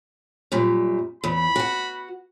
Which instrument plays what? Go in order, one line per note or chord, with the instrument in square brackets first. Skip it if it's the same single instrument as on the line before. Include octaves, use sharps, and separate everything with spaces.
[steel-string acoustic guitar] F#2 A#2 G3
[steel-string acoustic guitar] E2 [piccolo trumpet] B5
[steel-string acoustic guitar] F#4 F#5